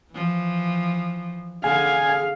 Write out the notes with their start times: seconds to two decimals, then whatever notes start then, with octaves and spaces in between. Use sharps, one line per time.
0.13 E3 F3
1.64 D3 G#4 F5 G#5